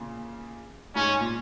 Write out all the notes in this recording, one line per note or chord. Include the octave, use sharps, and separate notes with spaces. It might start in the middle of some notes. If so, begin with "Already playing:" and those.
Already playing: A#2 C#3
G#2 C#4
A#2